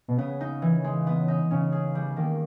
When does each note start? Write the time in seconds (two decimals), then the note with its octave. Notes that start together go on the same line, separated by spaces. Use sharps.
0.08 B2
0.18 C#3 B3
0.41 D#4
0.62 E3
0.84 G#3
1.07 B3
1.28 D#4
1.51 C#3 C#4
1.72 G#4
1.95 G3
2.16 D#3 A#3